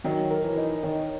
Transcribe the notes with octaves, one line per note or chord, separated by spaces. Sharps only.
D#3 F#3 C#5
A#4
E3
D#4
D#3 C#5